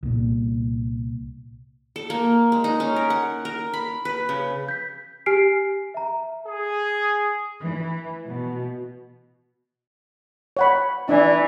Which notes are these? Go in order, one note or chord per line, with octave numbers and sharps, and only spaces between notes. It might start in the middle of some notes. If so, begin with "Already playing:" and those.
C2 A#2
A4
A#3
G#3
D#4
C#4
A#4
F#5
A#4
B5
B4
C#3
G6 B6
G4 G#5 F6 B6 C7 D7
E5 A#5
G#4
E3
B2
C#5 F#5 B5
E3 D4 D5 G#5